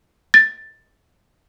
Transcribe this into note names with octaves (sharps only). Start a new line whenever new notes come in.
A6